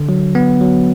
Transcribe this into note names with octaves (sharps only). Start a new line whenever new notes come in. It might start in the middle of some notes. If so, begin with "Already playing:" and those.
Already playing: D3
F#3
B3
F#3